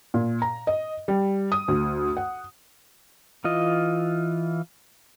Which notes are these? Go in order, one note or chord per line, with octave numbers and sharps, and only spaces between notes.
A#2
A#5
D#5
G3
D#6
D2
F#5
E3 F4 D#5